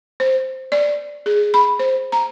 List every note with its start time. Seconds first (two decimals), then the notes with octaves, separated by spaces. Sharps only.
0.20 C5
0.72 D5
1.26 G#4
1.54 B5
1.79 C5
2.12 A#5